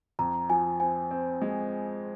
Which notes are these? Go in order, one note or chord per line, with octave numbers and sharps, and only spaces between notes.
F2 A#5
F3 G#5
C4 G#5
C4
G#3